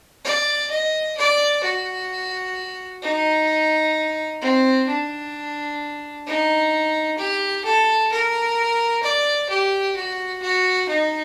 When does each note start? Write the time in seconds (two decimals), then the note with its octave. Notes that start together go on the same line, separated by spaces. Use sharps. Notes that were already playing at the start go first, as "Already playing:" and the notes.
0.24 D5
0.70 D#5
1.17 D5
1.63 F#4
3.02 D#4
4.41 C4
4.88 D4
6.26 D#4
7.18 G4
7.64 A4
8.12 A#4
9.03 D5
9.49 G4
9.96 F#4
10.42 F#4
10.88 D#4